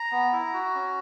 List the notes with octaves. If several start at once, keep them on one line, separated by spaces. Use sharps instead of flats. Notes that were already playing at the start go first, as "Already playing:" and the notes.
Already playing: A#5
B3
E4
F#4
C#4